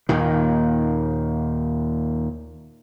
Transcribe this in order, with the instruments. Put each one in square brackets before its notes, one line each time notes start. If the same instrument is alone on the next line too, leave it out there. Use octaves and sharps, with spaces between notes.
[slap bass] D#2 A#2 D#3